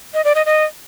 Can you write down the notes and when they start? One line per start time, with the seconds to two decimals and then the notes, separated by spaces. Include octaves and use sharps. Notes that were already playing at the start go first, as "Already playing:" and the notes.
0.14 D#5
0.24 D5
0.35 D#5
0.46 D#5